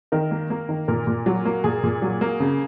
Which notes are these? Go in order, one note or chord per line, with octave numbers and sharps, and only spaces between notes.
D#3 A#4
A#3
A#3
D#3
A#2 A#4
A#2
F#3
A#3
A#2 G#4
A#2
F#3
A#3
C#3